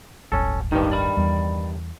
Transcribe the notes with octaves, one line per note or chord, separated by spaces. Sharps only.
D1 G1 C#4 A4
G2 D#3 D#4 G4 B4
D5 B5
E2 G3